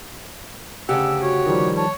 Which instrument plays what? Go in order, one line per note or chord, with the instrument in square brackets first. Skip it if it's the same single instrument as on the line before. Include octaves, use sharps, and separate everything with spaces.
[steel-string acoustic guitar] D2 C#3 G4 [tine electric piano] F#5 [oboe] E6
[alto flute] F#4 [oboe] C#5
[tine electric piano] D#3 F3 G3
[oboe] C#5 [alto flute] A5